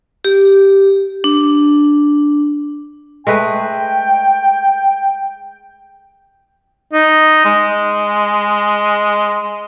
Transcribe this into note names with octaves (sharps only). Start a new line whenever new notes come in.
G4
D4
G#3 A3 B4 G5
D#4
G#3